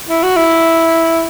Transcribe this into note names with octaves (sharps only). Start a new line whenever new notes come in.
E4
F#4
E4